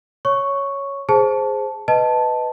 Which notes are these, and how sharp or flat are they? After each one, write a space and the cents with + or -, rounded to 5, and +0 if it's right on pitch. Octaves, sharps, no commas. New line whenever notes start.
C#5 +0 C#6 +0
G#4 +0 C5 +0 A5 -5
B4 +10 D#5 +0 A5 +0